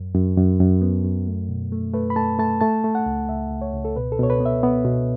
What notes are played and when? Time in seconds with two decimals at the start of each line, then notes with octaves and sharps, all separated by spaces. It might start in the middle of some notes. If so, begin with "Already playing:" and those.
Already playing: F#2
0.15 F#2
0.38 F#2
0.60 F#2
0.82 B3
1.05 F#2
1.27 A3
1.49 B2
1.72 A3
1.93 A3 B4
2.10 B5
2.16 A3 A5
2.39 A3 A5
2.61 A3 A5
2.84 A3
2.95 F#5
3.06 C#2
3.29 C#2 E5
3.51 C#2
3.62 C#5
3.73 C#2
3.85 A4
3.96 B2 B4
4.12 A4
4.19 B2 C#5
4.30 B4
4.40 B3
4.46 E5
4.63 B3
4.85 B2